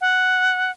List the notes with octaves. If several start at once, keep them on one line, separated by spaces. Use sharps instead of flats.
F#5